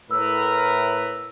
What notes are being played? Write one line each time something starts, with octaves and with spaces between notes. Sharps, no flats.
A2 A#4 B4 E6